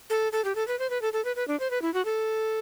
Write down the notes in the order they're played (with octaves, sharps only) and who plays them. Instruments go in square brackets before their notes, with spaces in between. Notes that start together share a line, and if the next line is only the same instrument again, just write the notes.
[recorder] A4
A4
G4
A4
B4
C5
B4
A4
A4
B4
B4
D4
C5
B4
E4
F#4
A4